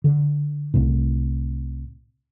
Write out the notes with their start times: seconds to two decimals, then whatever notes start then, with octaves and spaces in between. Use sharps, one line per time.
0.04 D3
0.74 C2 A2